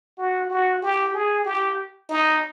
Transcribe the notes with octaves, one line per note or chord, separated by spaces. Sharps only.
F#4
F#4
G4
G#4
G4
D#4